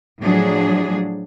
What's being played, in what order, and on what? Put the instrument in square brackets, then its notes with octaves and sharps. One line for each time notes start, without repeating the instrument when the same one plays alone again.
[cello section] A2 F3 F#3 D4 G#4